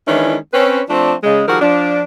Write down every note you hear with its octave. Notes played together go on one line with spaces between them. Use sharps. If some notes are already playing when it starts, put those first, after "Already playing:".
D#3 E3 G#3 C#4 D4 E4
C4 C#4 B4
F3 A3 C4 D4
C#3 G#3
D#3 F3 G3 F#4 G#4 A#4
F3 D4